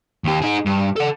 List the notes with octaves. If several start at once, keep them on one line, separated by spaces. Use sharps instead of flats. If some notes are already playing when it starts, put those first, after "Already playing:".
D#2 G4
D#4 G#4
G2
A4 F#5